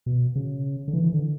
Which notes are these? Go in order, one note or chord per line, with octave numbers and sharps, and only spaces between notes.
B2
C#3
D3
E3
E3
D3